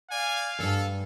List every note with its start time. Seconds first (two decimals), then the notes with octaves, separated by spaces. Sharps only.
0.10 D5 F5 G#5
0.59 E2 G2 A4